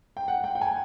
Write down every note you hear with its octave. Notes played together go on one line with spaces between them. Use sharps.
G5
F#5
G5
G5
G#5